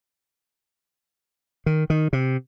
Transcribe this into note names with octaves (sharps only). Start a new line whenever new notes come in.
D#3
D#3
C3